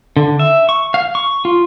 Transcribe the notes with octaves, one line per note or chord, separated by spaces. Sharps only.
D3
E5
C#6
F5
C#6
F4